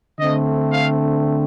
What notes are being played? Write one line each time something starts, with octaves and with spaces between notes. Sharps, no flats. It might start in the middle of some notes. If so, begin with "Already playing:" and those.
D3 A3 C4 D#5
F5